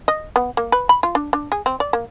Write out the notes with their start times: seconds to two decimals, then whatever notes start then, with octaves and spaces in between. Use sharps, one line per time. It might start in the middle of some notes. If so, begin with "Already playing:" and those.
0.08 D#5
0.36 B3
0.57 A#3
0.72 B4
0.89 B5
1.03 F4
1.15 D4
1.33 D4
1.52 G#4
1.66 C4
1.80 D5
1.93 A#3